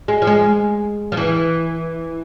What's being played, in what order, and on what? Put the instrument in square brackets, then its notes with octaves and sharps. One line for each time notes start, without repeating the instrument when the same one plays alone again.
[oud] G#3
F3
G#3
F3
E3